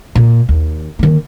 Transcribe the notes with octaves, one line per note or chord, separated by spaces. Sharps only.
A#2
D#2
D#3 A#3